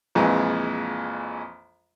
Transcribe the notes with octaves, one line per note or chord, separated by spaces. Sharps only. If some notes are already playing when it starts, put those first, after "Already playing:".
A#1 F2 A#2 E3 G#3